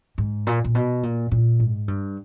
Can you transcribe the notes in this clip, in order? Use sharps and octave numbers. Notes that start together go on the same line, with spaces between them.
G#2
A#2
A#2
B2
A#2
A#2
G#2
G2